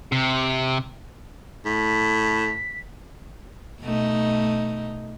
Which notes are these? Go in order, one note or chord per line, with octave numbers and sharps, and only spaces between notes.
C3
A2 B6
B2 A3 D#4